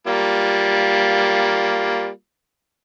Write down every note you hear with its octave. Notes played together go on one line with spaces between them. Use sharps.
G3 A#3 F4